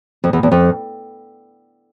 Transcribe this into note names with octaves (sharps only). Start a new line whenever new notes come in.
F2
E2
E2
F2